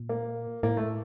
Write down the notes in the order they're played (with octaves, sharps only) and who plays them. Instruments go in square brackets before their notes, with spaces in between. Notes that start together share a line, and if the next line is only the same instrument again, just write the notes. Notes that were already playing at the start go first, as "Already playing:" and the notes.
Already playing: [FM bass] A#2
[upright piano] A#3
[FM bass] A2 [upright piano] A#3
[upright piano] A3